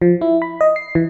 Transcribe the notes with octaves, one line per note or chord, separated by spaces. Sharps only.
F3
E4
B5
D#5
C7
E3